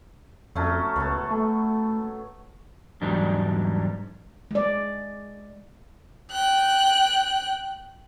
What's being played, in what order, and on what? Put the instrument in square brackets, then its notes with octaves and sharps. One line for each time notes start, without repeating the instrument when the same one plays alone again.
[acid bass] F2 [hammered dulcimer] F#3 A3 C#4
[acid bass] C#2 [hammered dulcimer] B3 A4
[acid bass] A3
[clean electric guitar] E2 G#2 F#3 G3 D4 D#4
[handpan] G#3 D5
[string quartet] G5 F#6